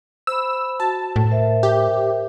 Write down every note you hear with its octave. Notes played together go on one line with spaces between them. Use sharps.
C5 B5 E6
F#4 A5
A2
A#4 C5 E5
G4